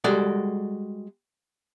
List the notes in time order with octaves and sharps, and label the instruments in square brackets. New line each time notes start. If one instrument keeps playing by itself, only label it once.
[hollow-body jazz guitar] G3 G#3 F#4 A4 D5